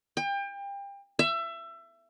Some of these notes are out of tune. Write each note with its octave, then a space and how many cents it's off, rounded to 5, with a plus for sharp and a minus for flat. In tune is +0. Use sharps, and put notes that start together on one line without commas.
G5 +30
E5 +25